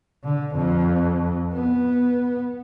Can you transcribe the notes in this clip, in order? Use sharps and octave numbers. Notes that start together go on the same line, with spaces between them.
D3
F2
B3